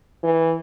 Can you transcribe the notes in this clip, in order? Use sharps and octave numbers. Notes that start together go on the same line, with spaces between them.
E3